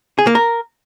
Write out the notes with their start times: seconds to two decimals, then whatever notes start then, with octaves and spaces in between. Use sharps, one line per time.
0.19 G#4
0.27 A#3
0.35 A#4